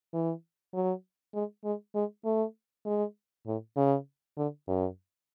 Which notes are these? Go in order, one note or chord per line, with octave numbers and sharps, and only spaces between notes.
E3
F#3
G#3
G#3
G#3
A3
G#3
A2
C#3
D3
F#2